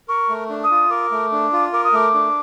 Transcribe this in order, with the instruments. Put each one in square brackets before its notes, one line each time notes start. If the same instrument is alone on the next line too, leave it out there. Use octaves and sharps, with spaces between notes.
[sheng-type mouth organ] A#4 [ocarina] C#6
[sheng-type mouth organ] A3
D4
[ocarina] D#6
[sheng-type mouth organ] F4
[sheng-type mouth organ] A#4 [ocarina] D6
[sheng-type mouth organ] A3
D4
F4
[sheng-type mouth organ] A#4 [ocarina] D6
[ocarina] D#6
[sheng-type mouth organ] A3 [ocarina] D6
[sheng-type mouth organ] D4